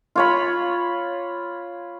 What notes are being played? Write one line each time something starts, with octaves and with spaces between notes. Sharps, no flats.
F4 C#5 B5